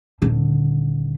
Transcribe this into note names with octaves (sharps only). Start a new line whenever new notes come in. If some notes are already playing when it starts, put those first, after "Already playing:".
D#1 D3